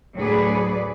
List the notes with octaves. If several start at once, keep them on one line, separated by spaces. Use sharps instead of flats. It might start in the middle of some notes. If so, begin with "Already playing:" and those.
D2 A2 F#3 G#4 B4 D5